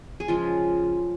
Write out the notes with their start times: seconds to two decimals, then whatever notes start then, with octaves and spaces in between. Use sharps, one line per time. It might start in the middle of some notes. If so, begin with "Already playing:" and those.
0.20 G#4
0.28 C#3 F3 G#3 F4